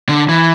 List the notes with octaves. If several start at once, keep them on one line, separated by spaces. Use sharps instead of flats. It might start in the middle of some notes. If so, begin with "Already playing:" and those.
D3
E3